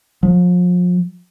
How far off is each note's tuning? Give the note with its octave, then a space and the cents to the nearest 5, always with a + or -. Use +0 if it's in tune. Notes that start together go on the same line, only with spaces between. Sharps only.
F3 +35